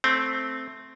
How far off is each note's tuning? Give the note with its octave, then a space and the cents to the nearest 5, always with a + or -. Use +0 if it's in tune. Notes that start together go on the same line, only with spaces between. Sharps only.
A3 +0 C4 +0